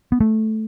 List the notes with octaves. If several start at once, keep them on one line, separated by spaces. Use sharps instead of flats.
B3
A3